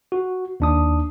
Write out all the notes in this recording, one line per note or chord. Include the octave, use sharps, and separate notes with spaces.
F#4
D#2 D4 D#6